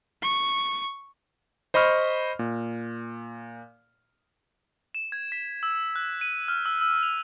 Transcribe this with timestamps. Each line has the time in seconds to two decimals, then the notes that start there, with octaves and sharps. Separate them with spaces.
0.22 C#6
1.74 C5 D#5 B5 C#6 F6
2.39 A#2
4.95 E7
5.12 G#6
5.32 B6
5.63 E6
5.96 F#6
6.21 D#7
6.48 F6
6.66 E6
6.81 E6
7.03 F7